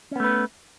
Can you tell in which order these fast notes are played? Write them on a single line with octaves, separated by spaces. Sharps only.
C#4 B3 A3 B4